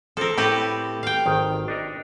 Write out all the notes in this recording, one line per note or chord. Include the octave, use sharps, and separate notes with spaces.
F3 C4 A4 A#4 C5
A2 C4 G4 A4 B4
F5 G5
G#1 D#3
D4 D#4 A#4